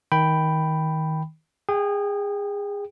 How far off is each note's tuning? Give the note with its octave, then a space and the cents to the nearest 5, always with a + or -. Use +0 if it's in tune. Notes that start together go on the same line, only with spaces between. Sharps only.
D#3 +20 G5 +0 B5 +0
G#4 -25 G5 +0